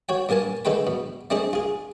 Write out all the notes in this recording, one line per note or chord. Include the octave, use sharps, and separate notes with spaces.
F#4 C#5 G5
G2 A#3 A#4 G#5 A5
D3 G#3 A4 B4 G5 B5
B2
A3 C4 D4 G#4 D#5
F4 G#4